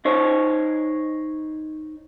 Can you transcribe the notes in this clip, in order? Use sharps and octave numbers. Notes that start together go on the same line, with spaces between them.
D#4 C5 C#5